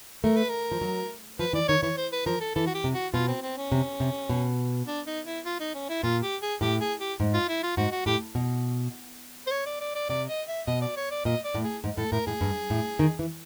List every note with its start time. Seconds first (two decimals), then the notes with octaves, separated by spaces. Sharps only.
0.24 A3 A#4
0.36 B4
0.49 A#4
0.71 F3
0.81 F#3
1.39 F3 B4
1.53 E3 D5
1.68 D#3 C#5
1.83 E3 C#5
1.97 C5
2.12 B4
2.26 F3 A#4
2.41 A4
2.55 E3 A4
2.67 F#4
2.75 G4
2.84 C3
2.94 F#4
3.14 B2 F4
3.28 C4
3.42 C4
3.57 C#4
3.72 C3
4.00 C3
4.30 B2
4.87 D4
5.07 D#4
5.26 E4
5.45 F4
5.60 D#4
5.74 C#4
5.89 E4
6.03 A#2 F4
6.23 G4
6.42 G#4
6.61 A2 G4
6.80 G#4
7.00 G4
7.20 G#2
7.34 F4
7.48 E4
7.63 F4
7.77 G#2 F#4
7.92 F#4
8.06 A2 G4
8.35 B2
9.47 C5
9.51 C#5
9.66 D5
9.81 D5
9.95 D5
10.09 C3 D5
10.29 D#5
10.48 E5
10.67 B2 D#5
10.82 D5
10.96 C#5
11.11 D5
11.25 A#2 D#5
11.45 D5
11.54 A2
11.64 G#4
11.84 G#2
11.98 A2 A4
12.12 A2 A#4
12.27 A2 G#4
12.41 G2
12.70 A2
12.99 D#3
13.19 E3